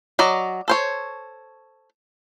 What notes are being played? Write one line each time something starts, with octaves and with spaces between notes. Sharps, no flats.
F#3 D5 D#5
A4 C5 C#5